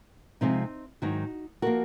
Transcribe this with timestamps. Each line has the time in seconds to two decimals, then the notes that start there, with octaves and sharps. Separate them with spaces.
0.41 C3 F3 G#3 C4 D#4
1.02 G#2 D#3 F#3 D#4 F#4
1.62 F3 A#3 F#4 A#4